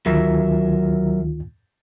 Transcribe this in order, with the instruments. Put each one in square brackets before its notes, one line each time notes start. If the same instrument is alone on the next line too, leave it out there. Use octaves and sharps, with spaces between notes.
[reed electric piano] D2 D#3 F4 [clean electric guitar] F#3 A#4 E5